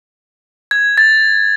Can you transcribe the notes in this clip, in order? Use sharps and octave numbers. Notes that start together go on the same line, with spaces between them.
G#6
A6